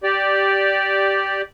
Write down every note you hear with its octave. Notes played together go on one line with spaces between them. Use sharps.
G4 D5